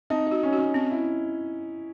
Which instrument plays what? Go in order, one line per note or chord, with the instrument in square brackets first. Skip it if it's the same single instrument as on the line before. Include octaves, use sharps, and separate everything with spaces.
[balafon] C4 [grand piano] D#4
[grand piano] D#4 [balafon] F#4
[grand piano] C#4
[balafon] F#4
[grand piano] C#4
[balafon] C4 [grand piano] D#4
[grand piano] E4